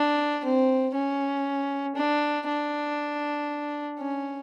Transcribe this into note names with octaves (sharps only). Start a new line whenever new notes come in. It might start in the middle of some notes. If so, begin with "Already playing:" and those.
Already playing: D4
C4
C#4
D4
D4
C#4